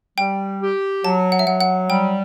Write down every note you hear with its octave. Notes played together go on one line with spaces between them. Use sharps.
G3 G5
G4
F#3 A5
F#5
E5
F#3 F#5
F#5
G3 G5